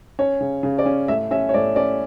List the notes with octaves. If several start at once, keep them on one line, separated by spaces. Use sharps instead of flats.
C#4 C#5
C#3
C#3
D5
C#4
A2 E5
C#4 E5
C#5
A2 D5
C#4 D5